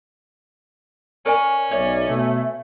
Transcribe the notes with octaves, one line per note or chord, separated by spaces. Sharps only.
C#4 A#4 D5 G#5 C#6
B1 D#4 C#5 D5 E5
B2 A3